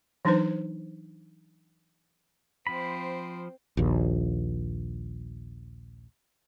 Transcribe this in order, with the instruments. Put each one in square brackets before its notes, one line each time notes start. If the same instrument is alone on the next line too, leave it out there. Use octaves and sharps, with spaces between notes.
[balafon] E3 F#3 D4 D#4 B4 C5
[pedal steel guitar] F3 B5 [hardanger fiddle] C4 C5
[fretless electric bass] A#1 D#2